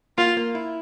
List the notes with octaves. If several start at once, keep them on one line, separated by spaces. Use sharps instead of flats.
A#3 F4
A#3
E4